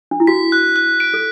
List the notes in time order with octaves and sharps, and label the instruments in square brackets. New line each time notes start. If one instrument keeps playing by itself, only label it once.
[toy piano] D4
E4
[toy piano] F#4 [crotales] B6
[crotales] F#6
F#6
D7
[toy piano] A4